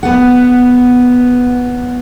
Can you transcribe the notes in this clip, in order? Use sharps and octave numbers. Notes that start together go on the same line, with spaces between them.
B3 F#5